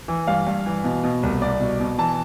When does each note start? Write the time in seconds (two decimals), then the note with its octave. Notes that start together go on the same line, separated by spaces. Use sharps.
0.08 E3
0.27 G2 F5
0.47 G2
0.66 E3
0.84 B2
1.04 B2
1.23 C2
1.41 C2 D5
1.61 B2
1.80 B2
1.98 E3 A5